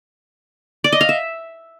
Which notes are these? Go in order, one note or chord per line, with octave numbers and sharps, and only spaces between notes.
D5
D#5
F5
E5